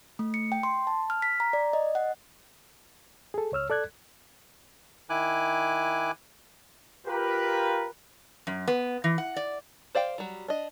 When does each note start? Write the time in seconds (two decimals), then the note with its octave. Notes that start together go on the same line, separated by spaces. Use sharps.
0.19 A3
0.34 C#7
0.52 G5
0.63 C6
0.87 A5
1.10 F6
1.22 B6
1.40 A#5
1.53 D5
1.73 D#5
1.95 F#5
3.34 G#4 A4
3.52 C#2 C#5 E6 F6
3.70 A4 D5 F#6 G#6
5.10 D#3 E4 G#5 D6 F#6
7.07 F4 G4 A#4 B4
8.47 F#2
8.68 B3
9.04 E3
9.18 F#5
9.36 D5
9.95 C5 D5 F5 G5
10.18 F#3 G3
10.48 D4 D#5